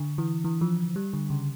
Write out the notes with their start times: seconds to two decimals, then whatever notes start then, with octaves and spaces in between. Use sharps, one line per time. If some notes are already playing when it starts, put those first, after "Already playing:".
Already playing: D3
0.18 E3
0.44 E3
0.61 F3
0.96 G3
1.13 D3
1.30 C#3